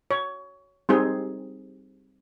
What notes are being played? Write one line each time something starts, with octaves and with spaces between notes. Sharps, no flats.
C#5
G3 C4 D#4 G#4